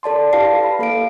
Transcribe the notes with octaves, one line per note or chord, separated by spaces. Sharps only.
A4 D5 A5 C6
E4 G4 B4 F5 A5 C7
F5 B5
A#3 A4 F5 D7